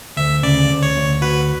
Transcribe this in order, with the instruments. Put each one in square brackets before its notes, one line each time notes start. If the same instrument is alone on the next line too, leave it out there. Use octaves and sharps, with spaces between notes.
[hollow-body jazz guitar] D2 [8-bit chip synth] E5
[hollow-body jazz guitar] C#3 [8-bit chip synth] D5
[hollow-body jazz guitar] D2
[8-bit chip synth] C#5
[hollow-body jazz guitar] D2
[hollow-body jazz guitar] F#4 [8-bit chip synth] B4